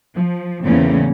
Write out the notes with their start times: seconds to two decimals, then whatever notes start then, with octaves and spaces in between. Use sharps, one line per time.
0.15 F3
0.64 E2 A2 C#3 A#3 C4 C#4